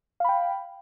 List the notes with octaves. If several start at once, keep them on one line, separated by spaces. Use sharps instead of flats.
F5 G5 B5